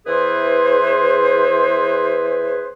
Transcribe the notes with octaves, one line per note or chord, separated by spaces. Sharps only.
E2 E3 G#4 B4 C5